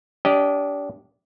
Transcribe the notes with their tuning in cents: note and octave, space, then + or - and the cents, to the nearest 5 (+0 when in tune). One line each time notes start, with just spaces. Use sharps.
D4 -35 G4 -10 D#5 +0